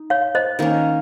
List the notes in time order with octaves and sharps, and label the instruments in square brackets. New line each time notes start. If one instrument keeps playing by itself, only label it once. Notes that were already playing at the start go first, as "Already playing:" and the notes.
Already playing: [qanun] D#4
[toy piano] C#5 F5
C5 D#5
[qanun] D#3 A#3 C#4